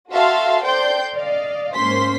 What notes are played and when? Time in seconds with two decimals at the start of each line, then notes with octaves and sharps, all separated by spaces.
0.11 F#4 A4 E5 F5 A5 C6
0.63 A4 C5 D5 G5 C6 G6
1.14 D5 D#5 F5
1.74 G#2 A#3 C#4 C5 C6 B6